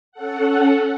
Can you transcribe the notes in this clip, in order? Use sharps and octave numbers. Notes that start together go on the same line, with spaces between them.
C#4 A4 F#5